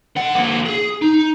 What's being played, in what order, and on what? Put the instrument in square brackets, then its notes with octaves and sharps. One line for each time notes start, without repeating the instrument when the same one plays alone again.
[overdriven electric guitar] D3 F#5
D3 A#3
G#4
D#4